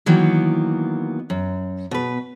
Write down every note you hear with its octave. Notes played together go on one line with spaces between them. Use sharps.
D#3 E3 F#3 A#3 B3
F#2
B2 B4